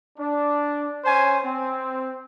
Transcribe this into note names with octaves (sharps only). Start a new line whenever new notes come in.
D4
C#4 C5 G#5
C4